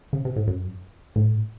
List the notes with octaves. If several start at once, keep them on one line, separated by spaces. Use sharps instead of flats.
C#3
C3
A2
F#2
A2